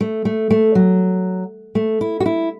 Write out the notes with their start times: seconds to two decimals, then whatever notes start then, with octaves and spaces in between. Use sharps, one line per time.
0.01 A3
0.25 A3
0.51 A3
0.75 F#3
1.75 A3
2.01 E4
2.20 F#4
2.26 E4